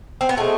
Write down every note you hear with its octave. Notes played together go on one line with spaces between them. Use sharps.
C4
B3
B2 G#3 A3